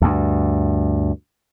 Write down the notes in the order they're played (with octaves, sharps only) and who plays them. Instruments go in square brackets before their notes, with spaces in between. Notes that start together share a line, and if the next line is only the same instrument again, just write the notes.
[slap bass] D2 G2